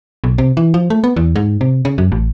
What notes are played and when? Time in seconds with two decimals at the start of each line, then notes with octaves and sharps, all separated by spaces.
0.24 B1
0.38 C3
0.57 E3
0.74 F3
0.90 A3
1.04 B3
1.16 E2
1.36 G#2
1.61 C3
1.85 C#3
1.98 F#2
2.12 A1